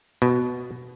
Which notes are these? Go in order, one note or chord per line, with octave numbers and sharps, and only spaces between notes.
B2